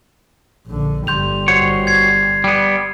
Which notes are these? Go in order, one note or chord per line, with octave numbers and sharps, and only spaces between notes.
A#1 D3
G1 G3 C6 G6 F7
F#4 C5 C#5
G#6 C7
G3 B3